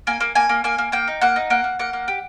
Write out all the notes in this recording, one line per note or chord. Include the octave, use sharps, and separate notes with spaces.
A#3 G#5
A#3
A#3 G#5
A#3
A#3 G#5
A#3
A#3 G5
D#4
A#3 F#5
D#4
A#3 F#5
A#3
A#3 F#5
A#3
G4